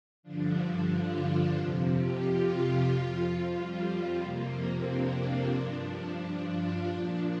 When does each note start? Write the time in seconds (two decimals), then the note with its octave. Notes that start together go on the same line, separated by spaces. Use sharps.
0.23 G2 D3 F3 D4
0.90 F4
1.55 F2 C3 F3
1.88 G4
2.22 F4
2.55 F4
2.88 F2 F3
3.21 F4
3.55 G3
4.19 F2 C3 F3 A#3
4.53 C4
4.86 D4
5.19 C4
5.52 G2 F3 D4
6.51 F4
6.84 A#2 F3 D4